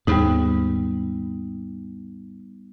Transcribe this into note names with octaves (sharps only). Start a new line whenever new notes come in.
D#2 G#2 G3 B3 D#4